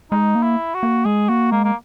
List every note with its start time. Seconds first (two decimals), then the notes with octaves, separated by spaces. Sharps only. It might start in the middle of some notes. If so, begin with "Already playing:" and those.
0.12 G#3 D#4
0.35 A#3
0.43 E4
0.74 F#4
0.83 A#3
1.05 G#3 G#4
1.29 A#3 F#4
1.52 G#3 A#3
1.65 A#3